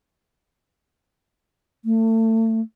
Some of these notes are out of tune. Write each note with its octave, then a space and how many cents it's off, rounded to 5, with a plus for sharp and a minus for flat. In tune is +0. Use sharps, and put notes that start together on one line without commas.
A3 +30